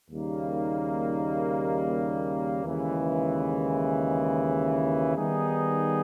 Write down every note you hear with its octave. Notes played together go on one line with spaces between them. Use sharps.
D#2 C#3 G3 A#3 D#4
D#2 C#3 E3 G#3
D#3 G3 B3 D#4 G#4